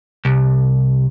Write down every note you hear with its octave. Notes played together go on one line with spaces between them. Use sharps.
C2